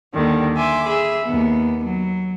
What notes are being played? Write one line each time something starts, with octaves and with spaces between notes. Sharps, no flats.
D#2 D3 D#3 G3
E5 G#5 C6 D6
G#4 E5 B5
D#2 B3
F#3